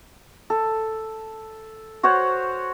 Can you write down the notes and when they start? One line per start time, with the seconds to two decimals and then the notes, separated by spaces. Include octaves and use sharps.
0.50 A4
2.03 F#4 C5 C#5 F#5